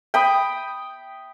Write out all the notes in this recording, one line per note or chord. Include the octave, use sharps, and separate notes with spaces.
G5 B5 D#6